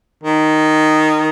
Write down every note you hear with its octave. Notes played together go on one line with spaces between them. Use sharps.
D#3